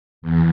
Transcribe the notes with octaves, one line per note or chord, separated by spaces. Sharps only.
E2